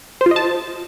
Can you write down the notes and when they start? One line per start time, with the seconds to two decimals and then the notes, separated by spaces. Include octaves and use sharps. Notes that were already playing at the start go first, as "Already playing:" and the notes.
0.21 C5
0.26 F4
0.31 D#5
0.36 A5